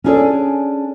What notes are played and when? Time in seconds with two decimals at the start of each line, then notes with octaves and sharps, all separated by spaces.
0.04 C#4 D4 G#4 A4 C#5 D5